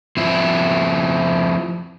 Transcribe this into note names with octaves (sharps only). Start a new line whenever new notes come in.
F3 C4 E4